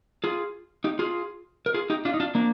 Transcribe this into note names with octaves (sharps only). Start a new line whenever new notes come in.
F4 G#4
D#4 G4
F4 G#4
A#4
F4 G#4
D#4 G4
D4 F4
D#4
D4 F4
A#3 D4